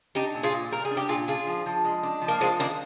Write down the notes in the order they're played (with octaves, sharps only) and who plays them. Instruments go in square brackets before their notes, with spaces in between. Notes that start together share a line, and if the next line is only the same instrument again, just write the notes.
[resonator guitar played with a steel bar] D4 [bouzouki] D#4 G4
[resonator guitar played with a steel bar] A#2
[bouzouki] F4 G#4
[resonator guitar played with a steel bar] A#2
[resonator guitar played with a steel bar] G3 [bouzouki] A#4
[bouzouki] G#4
[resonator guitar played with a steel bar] D4
[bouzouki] G4
[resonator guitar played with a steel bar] A#2 [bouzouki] F4 G#4
[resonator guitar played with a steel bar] D4 [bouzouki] F4 G#4
[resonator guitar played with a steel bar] F3
F3
G#3
D4
F3
[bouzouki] A#3
[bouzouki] G#3 C4 [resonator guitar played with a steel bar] F4
[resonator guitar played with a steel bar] D#3 [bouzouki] A#3 D4